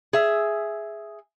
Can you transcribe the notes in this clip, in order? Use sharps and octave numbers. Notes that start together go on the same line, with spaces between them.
G#4 E5